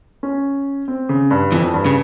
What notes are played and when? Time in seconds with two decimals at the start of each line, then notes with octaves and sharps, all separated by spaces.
0.23 C#4
0.88 C4
1.09 C#3
1.31 G2
1.52 F2 E3
1.74 G2
1.86 C#3